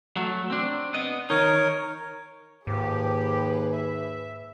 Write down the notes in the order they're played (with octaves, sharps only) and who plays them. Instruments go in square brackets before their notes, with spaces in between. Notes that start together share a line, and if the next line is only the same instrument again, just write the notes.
[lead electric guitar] F#3 A3
C4 D4
B3 D#5
[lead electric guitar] D#3 D#4 [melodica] A#4 C#5
[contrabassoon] D#2 [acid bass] G#2 [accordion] F3 G4 [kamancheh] G#4 B4
[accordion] E5